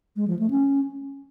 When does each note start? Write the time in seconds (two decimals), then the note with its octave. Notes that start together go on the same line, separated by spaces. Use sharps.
0.16 G#3
0.28 F3
0.39 A3
0.51 C#4